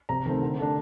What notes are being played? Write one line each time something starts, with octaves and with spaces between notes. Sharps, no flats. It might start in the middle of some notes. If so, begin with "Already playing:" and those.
C3 A#5
D#3 A3 C4
D3
A3 D4